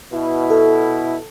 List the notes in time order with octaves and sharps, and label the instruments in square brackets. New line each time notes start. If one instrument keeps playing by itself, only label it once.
[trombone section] B2 E4
[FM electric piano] A4